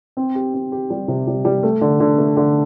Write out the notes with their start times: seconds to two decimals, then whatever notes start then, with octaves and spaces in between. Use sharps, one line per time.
0.17 C4
0.35 G4
0.54 C4
0.72 G4
0.90 G3
1.08 C3
1.27 G3
1.45 G3
1.63 A3
1.81 D3
2.00 D3
2.18 A3
2.37 D3